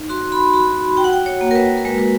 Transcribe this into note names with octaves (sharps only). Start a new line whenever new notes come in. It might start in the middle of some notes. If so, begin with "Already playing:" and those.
Already playing: D#4
F#4 C6
B5
F#4 B5
F#4 G5
F#5
G5
C#5
A#3
A#4
B4
A#4
G#3 B4
B4